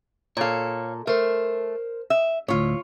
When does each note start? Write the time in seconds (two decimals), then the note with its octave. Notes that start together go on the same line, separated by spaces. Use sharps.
0.37 A#2 A4 C#5 F5
1.07 A3 A#4 C5
2.10 E5
2.48 D2 A2 F4 C#5